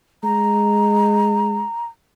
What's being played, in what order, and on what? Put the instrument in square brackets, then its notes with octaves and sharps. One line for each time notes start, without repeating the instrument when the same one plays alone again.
[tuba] G#3 [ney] A#5